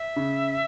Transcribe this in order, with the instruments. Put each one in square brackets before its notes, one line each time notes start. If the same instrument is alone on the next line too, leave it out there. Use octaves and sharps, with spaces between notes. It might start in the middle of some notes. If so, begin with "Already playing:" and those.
Already playing: [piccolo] E5
[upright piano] C#3